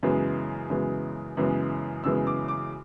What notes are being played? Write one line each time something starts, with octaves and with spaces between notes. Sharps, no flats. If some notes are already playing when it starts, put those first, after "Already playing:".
F#2 C#3 E3 G#3 B3
F#2 C#3 E3 G#3 B3
F#2 C#3 E3 G#3 B3
F#2 C#3 E3 G#3 B3 E6
D6
D6